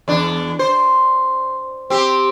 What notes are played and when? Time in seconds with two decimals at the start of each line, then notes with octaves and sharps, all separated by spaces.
0.08 E2 D4
0.59 C5
1.90 C4 G4